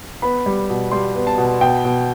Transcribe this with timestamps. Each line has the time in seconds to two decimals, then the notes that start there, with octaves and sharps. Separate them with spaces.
0.22 B3 B5
0.46 G3
0.70 B2
0.91 G3 C6
1.15 B3
1.27 A5
1.38 B2
1.61 B2 G5
1.85 B2